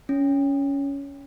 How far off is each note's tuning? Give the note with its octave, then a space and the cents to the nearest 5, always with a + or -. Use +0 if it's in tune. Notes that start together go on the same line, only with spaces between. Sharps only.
C#4 +10